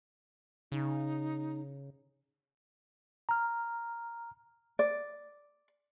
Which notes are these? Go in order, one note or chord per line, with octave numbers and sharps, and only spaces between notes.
C#3 D#4
A#5 F6
D5